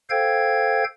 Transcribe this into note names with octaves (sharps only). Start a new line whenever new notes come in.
A4 C5 F5 G5 G#6